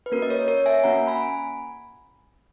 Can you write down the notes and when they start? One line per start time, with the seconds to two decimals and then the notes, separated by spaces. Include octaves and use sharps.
0.06 B4
0.12 A#3 C#4 F#4 A#4
0.22 D#5
0.30 A#4 C#5
0.48 A#4 C#5
0.66 E5 G#5
0.84 A#3 C#4 F#4 F#5 A#5
1.07 G#5 B5